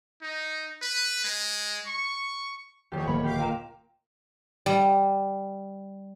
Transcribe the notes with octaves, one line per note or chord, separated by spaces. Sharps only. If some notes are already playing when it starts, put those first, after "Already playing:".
D#4
B4
G#3
C#6
D#1 E2 F3 G4 G#4 C#5 D6
D1 A#3 B5
F#4 G4 F5 D6
A#2 A#4 G5 A#5 E7
G3